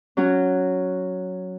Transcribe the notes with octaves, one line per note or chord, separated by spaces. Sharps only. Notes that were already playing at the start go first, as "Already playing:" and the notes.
F#3 C#4 F#4